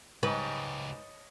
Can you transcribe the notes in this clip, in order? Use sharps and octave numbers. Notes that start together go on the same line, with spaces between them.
C#2 G#2 G4 B4 C#5 D#5 A5